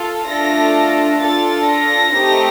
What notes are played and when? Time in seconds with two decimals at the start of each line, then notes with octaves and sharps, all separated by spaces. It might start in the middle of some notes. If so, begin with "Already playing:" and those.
Already playing: F4 A4
0.28 A3 D4 F4 A4 A#6
0.74 A#6
1.21 D4 F4 A4 A6
1.67 A#6
2.15 A3 C4 D#4 G4